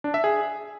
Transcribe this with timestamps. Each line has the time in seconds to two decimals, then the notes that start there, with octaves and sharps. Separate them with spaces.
0.04 D4
0.14 E5
0.24 G#4